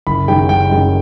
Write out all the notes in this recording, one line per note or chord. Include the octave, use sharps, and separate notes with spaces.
F#1 B5
F#2 D#3 G#3 G5
F#1 G5
F#2 D#3 G#3